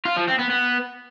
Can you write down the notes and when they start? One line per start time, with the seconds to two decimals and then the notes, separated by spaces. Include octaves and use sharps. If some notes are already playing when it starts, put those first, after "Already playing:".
0.05 F4
0.17 F3
0.28 C4
0.39 B3
0.51 B3